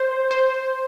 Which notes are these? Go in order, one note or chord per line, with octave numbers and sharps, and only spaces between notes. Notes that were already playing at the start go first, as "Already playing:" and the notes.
Already playing: C5
C5